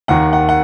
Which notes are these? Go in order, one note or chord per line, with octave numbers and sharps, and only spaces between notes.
D#2 D#3 A#3 F#5
F#5
F#5